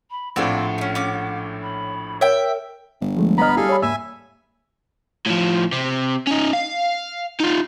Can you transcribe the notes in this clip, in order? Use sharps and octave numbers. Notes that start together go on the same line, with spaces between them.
B5
A#1 A2 C4 F4 D5 F#5
A3 C#4
C#4 D6
B5
A#4 C#5 E5 G5
G1
F3 G#3 A3
C2 B3 D#5 A#5 B5 F6
G3 E4 G#4 A4 F5
C#5 B5
E2 G#2 A#3 E5 G#5 E6
A2 F3
C3
C#4 D#4
F5
D#4 F4